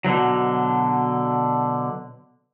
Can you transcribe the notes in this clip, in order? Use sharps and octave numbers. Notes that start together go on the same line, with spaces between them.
B2 D3 E3 F#3